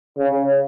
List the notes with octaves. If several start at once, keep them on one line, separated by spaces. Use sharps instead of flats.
C#3